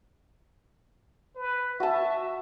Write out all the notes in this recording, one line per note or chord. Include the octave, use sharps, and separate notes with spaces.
B4
F#4 E5 A5